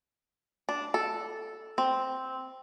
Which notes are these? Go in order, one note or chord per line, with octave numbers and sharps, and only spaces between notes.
D4
A4
C4